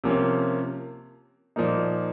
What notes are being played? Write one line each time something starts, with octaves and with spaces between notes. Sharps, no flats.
C3 F3 A#3 C#4
A#2 F3 A#3 D#4